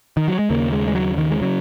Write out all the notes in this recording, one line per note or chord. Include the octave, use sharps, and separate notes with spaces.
D#3
F#3
G#3
D#2 C#3 A#3
G#3
G#3
F#3
D#3
G#3
C#3 F#3